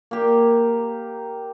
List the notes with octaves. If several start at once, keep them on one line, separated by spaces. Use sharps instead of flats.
A#3 G4